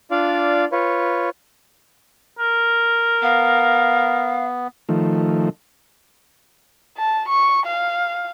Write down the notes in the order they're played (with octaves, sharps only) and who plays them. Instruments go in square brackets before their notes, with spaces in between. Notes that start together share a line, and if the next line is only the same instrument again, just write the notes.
[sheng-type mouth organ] D4 F4 D5 F5
F4 B4 C#5
[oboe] A#4
[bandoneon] B3 [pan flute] F5
[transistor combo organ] D#3 F3 A3
[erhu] A5
C#6
F5